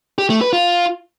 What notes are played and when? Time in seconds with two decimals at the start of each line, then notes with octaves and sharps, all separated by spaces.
0.18 G4
0.30 A3
0.41 B4
0.53 F4